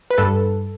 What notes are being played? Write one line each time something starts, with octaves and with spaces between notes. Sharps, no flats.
B4
G2 A4